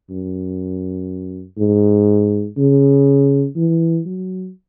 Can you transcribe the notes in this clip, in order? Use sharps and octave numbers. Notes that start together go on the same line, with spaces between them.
F#2
G#2
C#3
E3
F#3